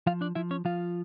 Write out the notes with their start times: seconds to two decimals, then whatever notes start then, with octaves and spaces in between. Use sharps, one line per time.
0.07 F3 F4 F5
0.21 D4 D5
0.35 F3 E4 E5
0.51 C#4 C#5
0.65 F3 F4 F5